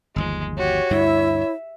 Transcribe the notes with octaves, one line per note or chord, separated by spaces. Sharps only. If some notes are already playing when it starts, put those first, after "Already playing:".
G1 D#2 F3 G#3
F#4 G4 C#5
D2 G2 D3 E4 E5